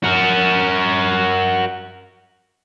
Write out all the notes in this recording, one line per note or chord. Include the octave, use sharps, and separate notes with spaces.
F#4 A#4